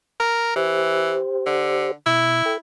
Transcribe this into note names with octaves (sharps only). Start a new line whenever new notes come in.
A#4
E3 G4 C5
D3
B2 E4
A4 G5